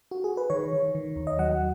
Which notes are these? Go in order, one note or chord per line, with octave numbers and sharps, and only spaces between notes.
F#4
G#4
B4
D#3 C#5
D#3
D#3
D#2
D#5
F#3 F#5